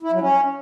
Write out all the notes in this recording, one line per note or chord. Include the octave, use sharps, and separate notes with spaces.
E4
F#3
C#4